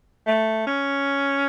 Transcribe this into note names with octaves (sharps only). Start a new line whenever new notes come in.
A3
C#4